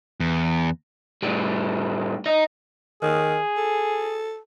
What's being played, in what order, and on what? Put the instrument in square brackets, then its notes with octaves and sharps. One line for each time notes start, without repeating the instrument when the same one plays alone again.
[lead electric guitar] E2
[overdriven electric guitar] A2 G3
D#5 A#5
[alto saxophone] D#3 [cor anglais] G#4
[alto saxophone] A4